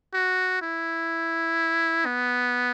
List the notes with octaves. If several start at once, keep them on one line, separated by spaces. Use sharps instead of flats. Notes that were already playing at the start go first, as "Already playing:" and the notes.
F#4
E4
B3